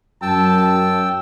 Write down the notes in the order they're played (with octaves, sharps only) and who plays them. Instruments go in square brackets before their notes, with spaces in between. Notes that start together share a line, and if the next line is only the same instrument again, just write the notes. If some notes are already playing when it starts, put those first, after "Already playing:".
[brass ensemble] F#2 [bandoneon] G5 E6 [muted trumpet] A5